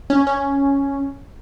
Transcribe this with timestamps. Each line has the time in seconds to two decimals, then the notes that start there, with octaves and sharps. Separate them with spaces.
0.10 C#4
0.27 C#4